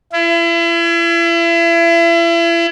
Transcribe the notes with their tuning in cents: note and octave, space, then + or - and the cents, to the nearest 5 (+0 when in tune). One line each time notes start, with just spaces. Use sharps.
E4 +35